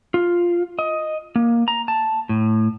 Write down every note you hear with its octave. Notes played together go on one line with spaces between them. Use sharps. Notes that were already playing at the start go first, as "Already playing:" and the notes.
F4
D#5
A#3
A#5
A5
A2